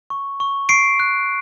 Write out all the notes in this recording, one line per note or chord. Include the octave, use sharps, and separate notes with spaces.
C#6
C#6
C#6 C7 D7
F#6